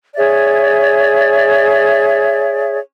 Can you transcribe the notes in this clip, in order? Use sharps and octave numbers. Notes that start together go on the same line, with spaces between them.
G#4 C#5 D5 E5